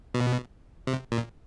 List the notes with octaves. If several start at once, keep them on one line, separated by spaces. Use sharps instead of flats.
B2
C3
A#2